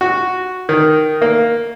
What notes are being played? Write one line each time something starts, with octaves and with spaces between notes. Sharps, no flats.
F#4
D#3
A#3